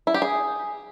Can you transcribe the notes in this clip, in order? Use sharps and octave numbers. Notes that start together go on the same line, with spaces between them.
E4
G4
G#4